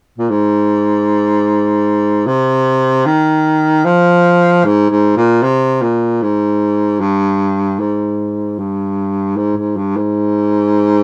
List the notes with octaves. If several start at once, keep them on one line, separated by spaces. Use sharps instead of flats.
A#2
G#2
C3
D#3
F3
G#2
G#2
A#2
C3
A#2
G#2
G2
G#2
G2
G#2
G#2
G2
G#2